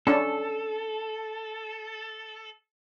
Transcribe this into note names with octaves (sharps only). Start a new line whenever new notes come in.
C#4 D4 A4